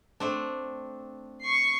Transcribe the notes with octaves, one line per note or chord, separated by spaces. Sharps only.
A3 C4 D4
C#6 C7